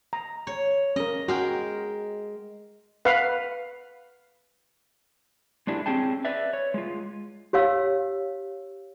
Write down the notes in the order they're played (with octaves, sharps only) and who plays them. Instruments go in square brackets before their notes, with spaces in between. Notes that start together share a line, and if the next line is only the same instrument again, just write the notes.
[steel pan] A#5
[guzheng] C#5
[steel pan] C#4 A#4 [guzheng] D#5
[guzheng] G#3 A#4 G5 [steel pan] F#4
[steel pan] B4 F5 F#5
[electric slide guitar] G#3 A3 D4 E4 G4
C4 C#4 G#4 G5 A5
B4 D5 E5
C#5
G#3 F4
[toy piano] G4 C#5 F5 E6